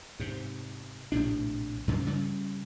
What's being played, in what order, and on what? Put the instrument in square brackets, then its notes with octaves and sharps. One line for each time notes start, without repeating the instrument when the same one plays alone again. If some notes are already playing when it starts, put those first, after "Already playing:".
[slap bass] G#2 C3
A#1 A2 C3 D4
G2 C#3 F3 G#3
C#3 G3